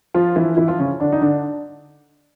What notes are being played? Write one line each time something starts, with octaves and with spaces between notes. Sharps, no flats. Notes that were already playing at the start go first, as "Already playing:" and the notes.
F3 F4
E3 E4
E3 E4
F3 F4
C#3 C#4
D3 D4
D#4
D3 D4